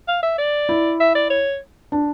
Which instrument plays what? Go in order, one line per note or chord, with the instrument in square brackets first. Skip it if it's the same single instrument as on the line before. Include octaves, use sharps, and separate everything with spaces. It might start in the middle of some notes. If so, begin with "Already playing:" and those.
[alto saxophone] F5
E5
D5
[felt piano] E4
[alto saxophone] E5
D5
C#5
[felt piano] D4